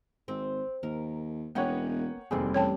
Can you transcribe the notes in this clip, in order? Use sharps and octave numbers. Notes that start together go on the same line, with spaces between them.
G#1 C4
D#2 A#4
E1 A#3 B3 C#4 C#5 F#5 G5
F1 D#2 C3 E3 G3 C4 G#4
A1 C#5 G5 A5